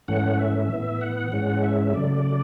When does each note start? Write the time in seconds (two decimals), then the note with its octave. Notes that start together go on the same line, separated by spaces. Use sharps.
0.08 G#2 E3 A3 C#4 F#5
0.39 E5
0.70 A2 E3 B3
1.01 F#5
1.32 G#2 E3 G#3 C#4
1.63 E5
1.93 C#3 F#3 A3 D5